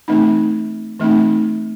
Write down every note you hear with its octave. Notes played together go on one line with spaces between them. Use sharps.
E3 A3 C4 D#4
E3 A3 C4 D#4